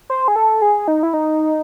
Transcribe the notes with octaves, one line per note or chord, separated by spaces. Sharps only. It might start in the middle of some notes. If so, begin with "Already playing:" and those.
C5
G#4
A4
G#4
D#4
E4
D#4